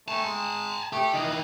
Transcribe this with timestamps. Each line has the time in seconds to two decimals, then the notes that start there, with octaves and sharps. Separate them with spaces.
0.08 A3 G#5 A5
0.24 G#3
0.93 A3 G4
1.13 D#3 E3 D#5